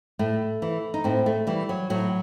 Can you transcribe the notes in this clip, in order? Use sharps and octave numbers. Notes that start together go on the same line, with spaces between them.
A2 A3
E3
D#4
A2 C4
A3
E3 G3
F#3
A2 F#3